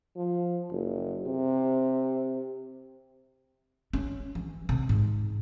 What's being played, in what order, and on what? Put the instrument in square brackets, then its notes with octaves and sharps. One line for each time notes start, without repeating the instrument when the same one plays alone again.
[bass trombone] F3
F#1
C3
[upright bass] C#4
E3
C3
G#2